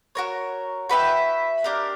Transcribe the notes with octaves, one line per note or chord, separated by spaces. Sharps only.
F#4 A#4 C#5
F#4 B4 E5 G5
D4 G4 A#4